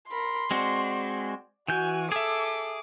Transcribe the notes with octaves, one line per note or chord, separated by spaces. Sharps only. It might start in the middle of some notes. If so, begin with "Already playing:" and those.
A#4 B5 C6
G#3 C4 F#4 D5
E3 F#4 G#5 G6
G#4 A4 E5 D6